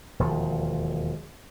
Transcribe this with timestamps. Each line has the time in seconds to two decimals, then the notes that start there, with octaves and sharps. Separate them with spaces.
0.19 E1 D#2 F3